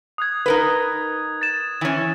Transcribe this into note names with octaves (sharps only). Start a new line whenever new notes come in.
D#6 F#6 G#6
D#4 A#4 B4
A6 E7
E3 C#4